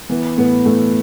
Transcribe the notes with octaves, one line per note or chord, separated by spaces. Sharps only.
E3 B3
A2 B3
A2 A3